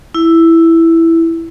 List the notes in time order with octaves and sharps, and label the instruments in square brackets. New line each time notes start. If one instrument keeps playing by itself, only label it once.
[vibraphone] E4